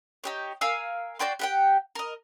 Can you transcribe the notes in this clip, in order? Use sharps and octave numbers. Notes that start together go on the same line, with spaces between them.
D#4 G4 C#5
A#4 F5 G#5 E6
F#4 D5 G5 C6
G4 F#5 G5
A#4 D#5